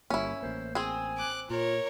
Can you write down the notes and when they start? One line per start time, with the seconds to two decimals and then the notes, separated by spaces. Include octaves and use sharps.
0.10 G1 G3 A#3 C#4 E4
0.42 A1 A#3 C5
0.75 C4 G#4 G#5
1.18 D6 F#6
1.50 A#2 F4 A#4 C#5